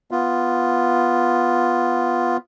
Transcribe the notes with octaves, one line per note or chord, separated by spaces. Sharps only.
B3 F4